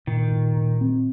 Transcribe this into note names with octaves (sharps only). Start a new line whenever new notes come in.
A#2 D#3
A#2
A#2
C4